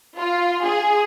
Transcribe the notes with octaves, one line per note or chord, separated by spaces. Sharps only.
F4
G#4